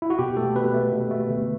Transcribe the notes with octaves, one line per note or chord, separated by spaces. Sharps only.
E4
F#4
B2 G4
A3 A4
B2 B4
A3
B2
A3
D3